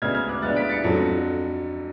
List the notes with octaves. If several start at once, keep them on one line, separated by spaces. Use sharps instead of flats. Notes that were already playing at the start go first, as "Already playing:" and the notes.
D2 C#3 G#3 B3 D4 F6 G#6
F6 G#6
D6 F#6
D2 C#3 G#3 B3 D4 F#6 A6
B6 D7
A6 C#7
F2 D3 F#3